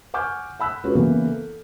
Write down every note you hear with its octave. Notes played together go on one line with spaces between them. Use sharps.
F#5 G#5 C#6 D6 F6 G6
F#5 B5 E6 F#6 B6
G#3 C#4 F4 F#4 A4 B4
C#3 E3 A#3 B3 A#4
A4